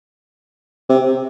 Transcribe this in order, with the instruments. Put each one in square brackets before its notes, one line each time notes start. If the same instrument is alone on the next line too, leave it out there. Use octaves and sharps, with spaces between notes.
[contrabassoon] C3